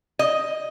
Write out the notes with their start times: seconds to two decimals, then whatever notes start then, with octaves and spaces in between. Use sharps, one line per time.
0.19 D#5